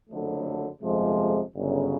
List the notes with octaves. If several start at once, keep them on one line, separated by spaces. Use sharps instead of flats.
F#1 F2 D3 F#3 A3
G1 F2 C3 F3 G#3
G1 F#2 C#3